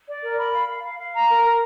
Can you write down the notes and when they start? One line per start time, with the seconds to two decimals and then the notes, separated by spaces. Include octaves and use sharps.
0.08 D5
0.23 A#4
0.38 B5
0.53 F5
0.68 F5
0.84 F5
0.99 F5
1.14 A#5
1.29 A#4
1.44 A#4